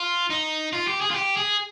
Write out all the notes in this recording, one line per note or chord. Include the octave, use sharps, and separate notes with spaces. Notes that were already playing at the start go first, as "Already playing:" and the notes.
Already playing: F4
D#4
F4
G4
G#4
F4
G4
G#4